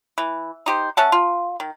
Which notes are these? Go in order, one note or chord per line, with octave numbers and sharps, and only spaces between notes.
E3
D#4 G4 C5
C#4 E5 F#5 A5
F4
D#3